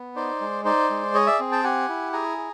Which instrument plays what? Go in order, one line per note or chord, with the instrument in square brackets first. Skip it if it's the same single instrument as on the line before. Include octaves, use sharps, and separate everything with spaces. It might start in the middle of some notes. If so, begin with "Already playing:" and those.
Already playing: [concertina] B3
D#4 C5 D5
G#3
D#4 C5 D5
G#3
G#4 C#5 D#5
D5 E5
C4
G5 A5
G4 F#5 G#5
E4
G#4 G#5 A#5
G#4